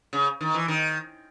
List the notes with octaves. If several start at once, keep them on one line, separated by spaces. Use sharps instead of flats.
C#3
D#3
E3
D#3